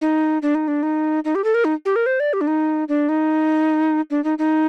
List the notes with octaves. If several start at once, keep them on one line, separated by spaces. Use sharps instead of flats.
D#4
D4
D#4
D4
D#4
D#4
G4
A4
A#4
D#4
G4
A#4
C5
D5
G4
D4
D#4
D4
D#4
D4
D#4
D#4